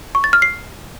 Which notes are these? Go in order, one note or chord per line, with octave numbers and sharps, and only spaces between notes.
C#6
A6
F6
C7